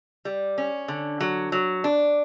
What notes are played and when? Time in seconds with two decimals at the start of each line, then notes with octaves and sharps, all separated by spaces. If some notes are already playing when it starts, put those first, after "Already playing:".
0.25 G3
0.58 C#4
0.88 D3
1.21 F#3
1.52 F#3
1.84 D4